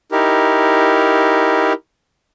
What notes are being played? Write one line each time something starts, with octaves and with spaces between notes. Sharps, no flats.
D#4 E4 G4 A#4